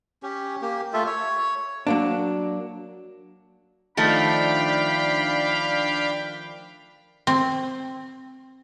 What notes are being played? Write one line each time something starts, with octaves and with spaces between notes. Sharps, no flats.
C#4 G4
A#3 G4
A3 F4 A4 E5
C#5
F#3 A#3 D4
D#3 F3 A3 D4 F5 G5 B5
C4